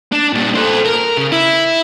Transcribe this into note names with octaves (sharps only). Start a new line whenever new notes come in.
D4
A#2 G3
A4 C5
A#4
C#3
E4